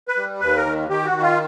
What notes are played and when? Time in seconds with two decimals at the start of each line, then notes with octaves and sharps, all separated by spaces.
0.08 B4
0.17 G3
0.41 D#2 B4
0.57 A#4
0.65 D#3
0.89 D#3 G4
1.05 F#4
1.13 D#3
1.22 F4